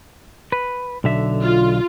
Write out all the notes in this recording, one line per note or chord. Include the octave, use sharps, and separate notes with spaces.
B4
B1 D3 E5
F4